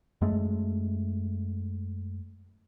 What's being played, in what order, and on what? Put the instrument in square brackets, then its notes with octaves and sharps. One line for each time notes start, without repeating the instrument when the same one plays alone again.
[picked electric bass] F#2 G#3 A3